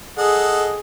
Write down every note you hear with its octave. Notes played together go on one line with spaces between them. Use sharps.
G#4 A4 D#5 F#5